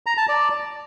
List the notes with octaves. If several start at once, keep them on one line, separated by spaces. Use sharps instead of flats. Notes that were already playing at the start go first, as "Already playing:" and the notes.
A#5
A5
D5